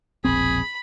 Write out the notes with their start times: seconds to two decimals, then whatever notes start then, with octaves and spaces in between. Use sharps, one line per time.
0.25 E1 A#1 C4 G#4 B5